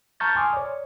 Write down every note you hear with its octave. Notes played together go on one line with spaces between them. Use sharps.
A5 A#5 C#6 F6 G6 A6
G#5 C6 D6 D#6 F6
C#5 D5